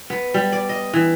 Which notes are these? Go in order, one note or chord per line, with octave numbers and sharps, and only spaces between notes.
B3
G3
D5
D#5
E3